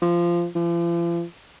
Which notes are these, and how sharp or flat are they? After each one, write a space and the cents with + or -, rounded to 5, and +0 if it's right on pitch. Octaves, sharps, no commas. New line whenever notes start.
F3 -15
F3 -45